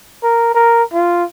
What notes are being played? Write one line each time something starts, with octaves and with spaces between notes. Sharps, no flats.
A#4
A#4
F4